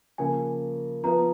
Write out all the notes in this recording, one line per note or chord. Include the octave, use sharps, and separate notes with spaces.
C#3 F3 A#3 G#5
F3 B3 F4 B4 A#5